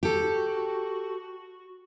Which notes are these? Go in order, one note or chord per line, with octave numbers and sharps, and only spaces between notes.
F#4 G4 A4